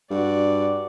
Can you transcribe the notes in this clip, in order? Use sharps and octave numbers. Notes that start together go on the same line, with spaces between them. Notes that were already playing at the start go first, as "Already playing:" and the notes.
G2 F#4 D5